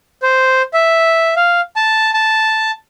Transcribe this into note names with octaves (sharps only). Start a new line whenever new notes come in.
C5
E5
F5
A5
A5